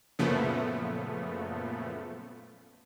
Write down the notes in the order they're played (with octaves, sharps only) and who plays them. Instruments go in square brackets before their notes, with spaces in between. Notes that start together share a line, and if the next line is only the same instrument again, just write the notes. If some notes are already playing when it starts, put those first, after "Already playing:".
[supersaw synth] F#2 A#2 C#3 F3 A3 B3